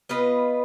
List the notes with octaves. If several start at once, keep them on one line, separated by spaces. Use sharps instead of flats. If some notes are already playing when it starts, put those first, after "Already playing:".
B3 F4 B4 D#5